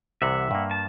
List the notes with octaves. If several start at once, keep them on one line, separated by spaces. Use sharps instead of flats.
C2 C3 E3 E5 F#5
G2 A#3
A5